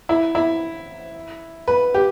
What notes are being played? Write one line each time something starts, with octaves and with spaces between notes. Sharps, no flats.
E4
E4
B4
G4